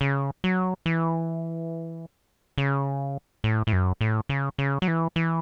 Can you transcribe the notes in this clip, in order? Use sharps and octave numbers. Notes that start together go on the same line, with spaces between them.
C#3
F#3
E3
C#3
A2
A2
F#2
A2
C#3
C#3
F#3
E3
E3